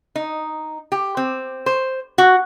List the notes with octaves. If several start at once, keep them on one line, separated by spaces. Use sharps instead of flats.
D#4
G4
C4
C5
F#4